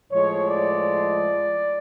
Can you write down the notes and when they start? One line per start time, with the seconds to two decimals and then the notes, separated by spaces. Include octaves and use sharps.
0.11 A2 F3 G#3 C#5
0.49 D5